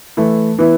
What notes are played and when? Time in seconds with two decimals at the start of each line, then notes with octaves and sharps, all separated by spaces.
0.17 E3 A3 E4
0.58 E3 B3 E4